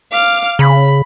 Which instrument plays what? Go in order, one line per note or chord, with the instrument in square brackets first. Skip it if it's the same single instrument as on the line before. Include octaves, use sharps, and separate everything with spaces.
[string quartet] F5 D6 F6
[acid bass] C#3 [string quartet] B5